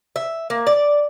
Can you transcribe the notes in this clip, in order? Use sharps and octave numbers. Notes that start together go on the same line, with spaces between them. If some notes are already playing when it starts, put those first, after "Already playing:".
E5
A#3
D5